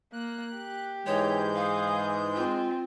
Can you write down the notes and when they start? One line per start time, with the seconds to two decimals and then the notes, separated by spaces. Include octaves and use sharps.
0.13 A#3 F#6
0.56 G4
1.06 G#2 E3 G#3 C#5 G6
1.56 G#4 F5
2.36 C4 F4